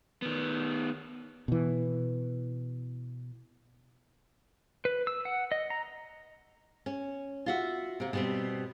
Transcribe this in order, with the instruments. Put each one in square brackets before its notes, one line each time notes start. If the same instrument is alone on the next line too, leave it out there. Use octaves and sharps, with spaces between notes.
[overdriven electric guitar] D#3 B3
[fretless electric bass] B2 E3
[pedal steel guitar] B4
E6
F#5
D#5
A#5
[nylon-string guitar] C#4
F4 F#4 E5
C3 A#3
B2 G3 C4